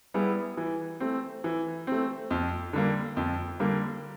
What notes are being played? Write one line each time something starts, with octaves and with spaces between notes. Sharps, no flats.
G3 B3 E4 G#4
E3
A3 C4
E3
A3 C4
F2
D3 G3 A#3
F2
D3 G3 A#3